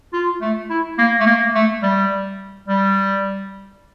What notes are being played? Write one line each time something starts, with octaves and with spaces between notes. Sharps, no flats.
F4
A3
E4
A#3
A3
A#3
A3
G3
G3